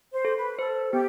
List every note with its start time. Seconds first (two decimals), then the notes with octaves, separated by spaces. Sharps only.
0.13 C5
0.25 A4
0.36 B4
0.59 A4 C5
0.92 B3 G4